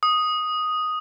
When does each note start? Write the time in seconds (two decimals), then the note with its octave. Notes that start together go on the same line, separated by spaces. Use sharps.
0.03 D#6